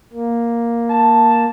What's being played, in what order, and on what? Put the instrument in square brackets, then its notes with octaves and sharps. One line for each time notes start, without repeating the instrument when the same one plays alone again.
[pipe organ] A#3
[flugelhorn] A5